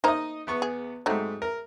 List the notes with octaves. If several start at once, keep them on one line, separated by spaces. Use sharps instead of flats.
A#3 D#4 C5 D#5 A#5
E2 B3 C#6
G#4
G#2 F#3 A3 C4 D#4
A#4